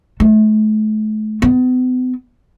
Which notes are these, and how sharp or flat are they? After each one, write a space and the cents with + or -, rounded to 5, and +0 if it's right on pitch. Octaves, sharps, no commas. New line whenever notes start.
A3 -40
B3 +40